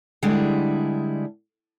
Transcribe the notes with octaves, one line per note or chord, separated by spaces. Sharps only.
D3 G3 G#3 D4 E4 G#4